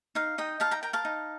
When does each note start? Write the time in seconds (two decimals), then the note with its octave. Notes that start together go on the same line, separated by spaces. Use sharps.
0.15 D#4 F5
0.38 D#4 D#5 G5
0.60 D#4 F5 A5
0.71 G5 A#5
0.83 A#4 G5 A#5
0.93 F5 A5
1.05 D#4